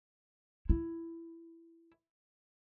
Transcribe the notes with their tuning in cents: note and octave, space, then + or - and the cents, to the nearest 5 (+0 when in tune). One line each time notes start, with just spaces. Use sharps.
E4 +10